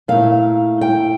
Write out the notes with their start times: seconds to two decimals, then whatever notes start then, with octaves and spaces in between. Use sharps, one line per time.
0.08 A#2 A3 E4 F5
0.81 G5